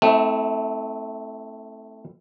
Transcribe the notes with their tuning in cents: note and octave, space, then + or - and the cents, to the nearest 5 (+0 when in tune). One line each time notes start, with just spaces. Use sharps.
A3 +0 C4 +0 E4 -40